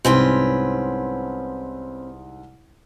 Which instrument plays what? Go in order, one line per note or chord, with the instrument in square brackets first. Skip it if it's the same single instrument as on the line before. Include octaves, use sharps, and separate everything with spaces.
[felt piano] C2 G#2 C6 [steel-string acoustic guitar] C4 C#4 B4